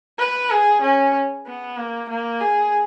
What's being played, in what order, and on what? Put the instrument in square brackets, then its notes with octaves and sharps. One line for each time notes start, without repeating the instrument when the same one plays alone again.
[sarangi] B4
G#4
C#4
B3
A#3
A#3
G#4